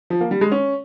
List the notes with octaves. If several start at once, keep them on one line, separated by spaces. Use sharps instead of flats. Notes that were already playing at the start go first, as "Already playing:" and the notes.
F3
A#3
G3
G#3
C#4